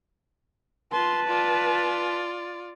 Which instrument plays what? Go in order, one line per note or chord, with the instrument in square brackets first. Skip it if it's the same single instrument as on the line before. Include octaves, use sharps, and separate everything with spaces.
[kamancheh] F4 C6 [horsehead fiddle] B4 A5
[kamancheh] F4 D5